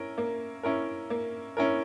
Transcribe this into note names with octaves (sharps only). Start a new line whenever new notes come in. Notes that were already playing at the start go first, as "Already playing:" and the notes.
Already playing: C#4 E4 A#4
A#3
C#4 E4 A#4
A#3
C#4 E4 A#4